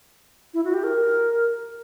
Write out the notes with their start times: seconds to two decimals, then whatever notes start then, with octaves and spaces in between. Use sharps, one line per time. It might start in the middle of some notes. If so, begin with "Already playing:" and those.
0.54 E4
0.65 F#4
0.74 G4
0.84 A#4